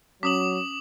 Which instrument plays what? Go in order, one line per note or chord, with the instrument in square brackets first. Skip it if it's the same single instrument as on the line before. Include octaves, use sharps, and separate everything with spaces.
[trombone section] F#3 [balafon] C#4 [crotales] D6 D#6 F#7